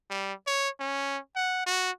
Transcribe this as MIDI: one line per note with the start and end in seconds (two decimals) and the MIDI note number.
0.10 0.33 55
0.47 0.69 73
0.80 1.19 61
1.36 1.62 78
1.66 1.91 66